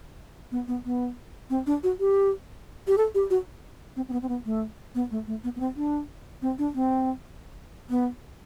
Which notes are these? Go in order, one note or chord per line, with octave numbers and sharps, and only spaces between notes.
B3
B3
B3
C4
D4
F#4
G4
G4
A4
G4
F#4
C4
C4
B3
C4
B3
A3
B3
A3
A3
B3
B3
C4
D4
C4
D4
C4
B3